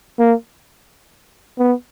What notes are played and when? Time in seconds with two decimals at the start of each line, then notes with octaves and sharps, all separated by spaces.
0.19 A#3
1.59 B3